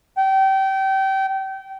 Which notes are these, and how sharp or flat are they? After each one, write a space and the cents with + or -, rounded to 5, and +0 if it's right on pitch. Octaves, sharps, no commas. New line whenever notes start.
G5 -25